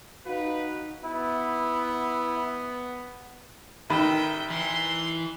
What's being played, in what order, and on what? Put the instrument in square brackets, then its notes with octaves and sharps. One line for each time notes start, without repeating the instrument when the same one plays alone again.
[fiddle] D#4 [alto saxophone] F#4 [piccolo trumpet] B4 [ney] F5
[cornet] B3 [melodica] E4
[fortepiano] A1 D#3 B5 [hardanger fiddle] E5 G5
[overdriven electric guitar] E3 [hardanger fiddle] C6